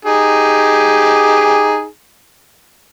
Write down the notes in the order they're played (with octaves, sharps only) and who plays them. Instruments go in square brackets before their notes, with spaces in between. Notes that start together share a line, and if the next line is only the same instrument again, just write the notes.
[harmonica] D#4 G4 G#4